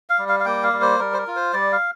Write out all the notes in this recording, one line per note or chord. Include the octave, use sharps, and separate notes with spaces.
F5
G3
F5
F5
A#3 G5
F5
G3
C5
G3 A#4
C5
A#4
F4
C5
G3 D5
F5